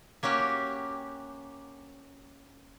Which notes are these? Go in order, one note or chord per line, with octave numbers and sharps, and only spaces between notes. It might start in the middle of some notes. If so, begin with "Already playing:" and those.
A#3 C#4 F#4 G4